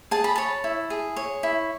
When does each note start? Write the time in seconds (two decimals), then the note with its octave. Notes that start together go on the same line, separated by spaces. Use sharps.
0.11 G#4 A5
0.24 B5
0.36 C#5 A5
0.64 E4
0.90 G#4
1.16 C#5
1.43 E4